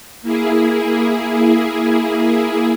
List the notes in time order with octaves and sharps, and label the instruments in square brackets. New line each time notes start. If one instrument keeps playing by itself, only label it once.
[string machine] A#3 E4 G#4